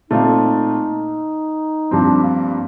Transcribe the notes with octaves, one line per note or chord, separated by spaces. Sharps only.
A#2 A3 C4 D#4 F4
G2 F3 C4 D4
A#3